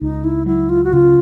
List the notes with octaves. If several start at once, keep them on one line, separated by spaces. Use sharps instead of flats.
C#2 D#4
E4
F#3 E4
F4
F#4
C#3 F4